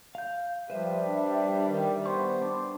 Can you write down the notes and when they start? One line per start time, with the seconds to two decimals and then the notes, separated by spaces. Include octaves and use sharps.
0.15 F5 G6
0.70 F3 G3 B4 C5 E5
1.04 D4
1.67 D#3
2.06 B3 C5 C#6
2.41 D4 D6